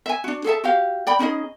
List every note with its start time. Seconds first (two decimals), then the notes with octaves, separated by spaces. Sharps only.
0.06 E5 G#5
0.24 D4 F#4
0.44 G#4 A4 E5 A5
0.64 F#4 G4 F5
1.07 D5 G5 B5
1.19 C#4 D#4 G#4 D#5